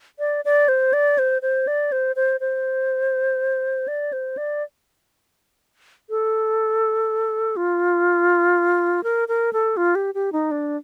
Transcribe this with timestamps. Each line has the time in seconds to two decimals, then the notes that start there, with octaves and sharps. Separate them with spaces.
0.19 D5
0.45 D5
0.68 C5
0.93 D5
1.18 C5
1.42 C5
1.67 D5
1.92 C5
2.16 C5
2.40 C5
3.88 D5
4.13 C5
4.37 D5
6.10 A4
7.57 F4
9.03 A#4
9.28 A#4
9.53 A4
9.77 F4
9.95 G4
10.15 G4
10.33 D#4
10.51 D4